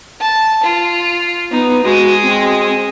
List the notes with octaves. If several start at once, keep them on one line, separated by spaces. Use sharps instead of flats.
A5
F4
B3 D#4
G#3 F#4 D#5
C4